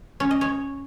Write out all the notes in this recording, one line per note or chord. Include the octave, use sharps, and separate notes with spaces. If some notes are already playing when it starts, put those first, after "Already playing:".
C#4
D#5
C#5